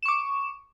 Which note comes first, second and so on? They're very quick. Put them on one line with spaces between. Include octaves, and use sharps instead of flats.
E7 C#6 D6